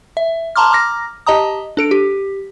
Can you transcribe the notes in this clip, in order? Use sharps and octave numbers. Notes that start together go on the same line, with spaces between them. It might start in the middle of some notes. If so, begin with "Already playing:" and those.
E5
A5 A#5 C6 D6 F6
A#5 D6 F6 A#6
G4 D#5 A5 A#5 D#6
D4 A4 D7
G4